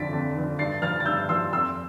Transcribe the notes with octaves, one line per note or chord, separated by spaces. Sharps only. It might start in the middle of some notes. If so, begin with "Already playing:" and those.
Already playing: F2 D3 F3 A6 B6 D7
F2
D3 F3
G2 A6 C7
F3 F6 A6
A6
G2 E6 G6
F3 C6 E6
F2 C6 E6